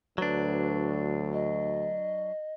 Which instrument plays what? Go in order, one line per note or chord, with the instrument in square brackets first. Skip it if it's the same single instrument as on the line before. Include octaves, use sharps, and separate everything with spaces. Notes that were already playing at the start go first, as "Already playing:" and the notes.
[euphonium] D2 [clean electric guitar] F#3 D4 [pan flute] B4
[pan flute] D#5